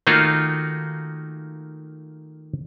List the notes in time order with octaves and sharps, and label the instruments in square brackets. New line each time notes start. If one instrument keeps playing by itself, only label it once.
[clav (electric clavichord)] D#3 A3 A#3 D#4 F4 F#4